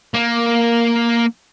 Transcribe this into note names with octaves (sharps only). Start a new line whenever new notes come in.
A#3